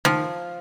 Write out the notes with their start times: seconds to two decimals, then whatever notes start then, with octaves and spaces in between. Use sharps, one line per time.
0.05 D#3 F3